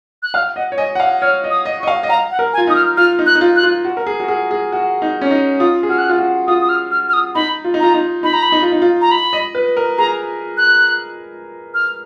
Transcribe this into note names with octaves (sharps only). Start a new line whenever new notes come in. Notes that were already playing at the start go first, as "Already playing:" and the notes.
F#6
F5 F6
D#5 F#5
C#5
D#5 G#5
F#5
F5
C#5 F6
D#5
D#6
D#5
D#5 C#6
F5
D#5
F5 A#5
F#5
A#4
G#5
F4
D#4 D#6
F6
F4 F6
D#4
F#6
D#4
F4
F#6
F4
F#4
A#4
G#4
F#4
G#4
G#4
F#4
D#4
C#4
D#4
F4 D#6
G#4
F#4 F6
F#6
F4 F6
F#4
F4 D#6
D#6
F6
F6
F6
D#6
D#4 B5
F4
D#4
F4 A#5
D#4
D#4 B5
A#5
B5
D#4
F4
D#4
F4
A#5
B5
D#5
B4
A#4
G#4 A#5
F#6
F6